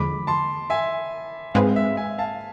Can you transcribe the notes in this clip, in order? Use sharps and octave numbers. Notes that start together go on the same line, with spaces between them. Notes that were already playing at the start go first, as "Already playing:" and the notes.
Already playing: E2 D3 F3 G#3 B5 D6
A5 C6
E5 G#5
G#2 G#3 C4 G#4 B4 F5
E5
E5 G#5
F5 A5